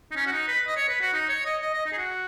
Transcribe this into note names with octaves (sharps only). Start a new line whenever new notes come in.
D#4
C#4
F#4
D#4
B4
D#5
C#5
B4
F#4
D#4
C#5
D#5
D#5
D#5
D#4
G#4
F#4